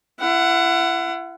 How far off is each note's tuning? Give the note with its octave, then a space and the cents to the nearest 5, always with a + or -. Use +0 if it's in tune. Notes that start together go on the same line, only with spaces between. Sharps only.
E4 +35 F#5 +0